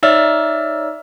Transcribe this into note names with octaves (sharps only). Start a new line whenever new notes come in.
D#4 C#5 D5 E5 E6 F6